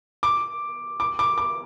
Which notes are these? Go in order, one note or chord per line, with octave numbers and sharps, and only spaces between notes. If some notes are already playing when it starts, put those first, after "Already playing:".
D6
D6
D6
D6